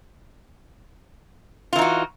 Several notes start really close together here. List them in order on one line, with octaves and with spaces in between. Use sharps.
F4 E3 D#4 F#4